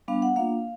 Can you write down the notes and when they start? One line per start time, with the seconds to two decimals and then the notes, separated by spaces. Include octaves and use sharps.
0.08 G3 B3 D4 F5
0.22 F#5
0.36 A#3 D4 F4 F5